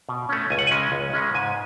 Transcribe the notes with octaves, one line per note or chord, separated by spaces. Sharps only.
B2
A3 C#4
C#2 G#5
F#5
C#3 G#3 C#4 G#5
C#2
C#3 G#3 C#4
G#2 G#5